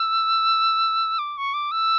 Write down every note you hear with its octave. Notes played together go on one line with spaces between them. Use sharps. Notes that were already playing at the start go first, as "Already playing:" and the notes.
Already playing: E6
D6
C#6
D6
E6